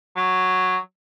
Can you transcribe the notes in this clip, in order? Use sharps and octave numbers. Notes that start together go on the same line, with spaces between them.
F#3